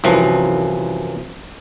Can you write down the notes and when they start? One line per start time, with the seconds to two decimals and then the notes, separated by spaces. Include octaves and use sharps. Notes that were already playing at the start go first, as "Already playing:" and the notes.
0.04 C2 F#2 E3 F3